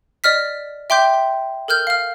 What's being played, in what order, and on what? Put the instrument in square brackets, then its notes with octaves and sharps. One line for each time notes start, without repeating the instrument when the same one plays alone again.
[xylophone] D5 D#5 F6 B6
E5 G5 C6 D6 G6
A4 A#4 F6 G6
F5 F6